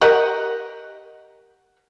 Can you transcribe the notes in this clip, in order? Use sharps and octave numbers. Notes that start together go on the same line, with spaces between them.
G4 A#4 D#5 F#5